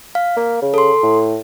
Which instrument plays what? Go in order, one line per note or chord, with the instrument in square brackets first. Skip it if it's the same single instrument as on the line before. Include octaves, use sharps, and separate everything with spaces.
[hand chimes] F5
[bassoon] A#3
C#3
[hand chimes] A4 C6
[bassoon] A2